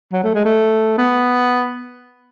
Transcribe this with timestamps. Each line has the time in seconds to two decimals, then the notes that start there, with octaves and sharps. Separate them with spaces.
0.12 F#3
0.24 A3
0.34 G#3
0.45 A3
0.98 B3